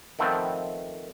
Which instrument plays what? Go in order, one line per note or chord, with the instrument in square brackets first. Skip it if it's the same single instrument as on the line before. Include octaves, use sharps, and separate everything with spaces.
[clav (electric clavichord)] D#3 F3 A3 B3 C4